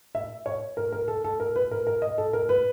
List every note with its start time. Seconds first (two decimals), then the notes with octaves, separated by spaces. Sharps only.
0.15 E5
0.46 C#5
0.77 A#4
0.92 A#4
1.08 A4
1.24 A4
1.40 A#4
1.56 B4
1.71 A#4
1.87 A#4
2.02 D#5
2.18 A4
2.33 A#4
2.49 B4